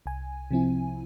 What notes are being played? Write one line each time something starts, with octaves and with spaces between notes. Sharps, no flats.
C2 G#5
C3 F3 C4 E4